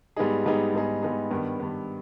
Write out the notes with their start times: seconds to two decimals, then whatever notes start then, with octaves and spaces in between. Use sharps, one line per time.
0.16 G#2 G3 B3 D#4 G#4
0.46 G#2 G3 B3 D#4 G#4
0.74 G#2 G3 B3 D#4 G#4
1.03 G#2 G3 B3 D#4 G#4
1.30 G2 D#3 B3
1.60 G2 D#3 B3